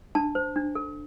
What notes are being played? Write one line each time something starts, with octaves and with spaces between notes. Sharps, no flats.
D4 A5
C5
D4
A4